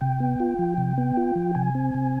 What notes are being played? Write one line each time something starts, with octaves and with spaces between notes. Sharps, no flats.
C3 G5
B3
F4
F3
C3
B3
F4
F3
C3 G#5
C4
C3